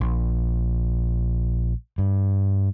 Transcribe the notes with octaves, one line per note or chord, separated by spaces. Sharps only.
A#1
G2